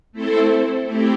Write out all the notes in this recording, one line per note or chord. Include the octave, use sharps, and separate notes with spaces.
A3 C4 E4 A4 C5
A3 C4 E4 G4